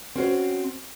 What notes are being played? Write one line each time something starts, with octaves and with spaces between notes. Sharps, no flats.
C4 C#4 F#4 C5